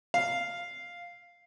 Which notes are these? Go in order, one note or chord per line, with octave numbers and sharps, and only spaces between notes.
F5